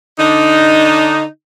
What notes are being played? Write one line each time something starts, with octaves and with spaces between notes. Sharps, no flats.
D3 D4 D#4